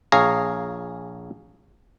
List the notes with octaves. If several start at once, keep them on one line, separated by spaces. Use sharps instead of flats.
A#1 G#4 C#5 F5 A#5